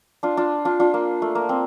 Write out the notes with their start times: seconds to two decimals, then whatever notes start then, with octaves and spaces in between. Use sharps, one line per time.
0.23 D4 F4
0.37 D4 F4
0.65 D4 F4
0.80 D4 F4
0.94 A#3
1.22 A3
1.35 A#3
1.49 C4